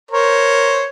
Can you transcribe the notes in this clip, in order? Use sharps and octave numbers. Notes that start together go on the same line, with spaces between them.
A#4 C5 C#5